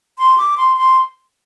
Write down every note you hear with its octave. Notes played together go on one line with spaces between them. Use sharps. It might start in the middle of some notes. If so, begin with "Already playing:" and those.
C6
D6
C6
C6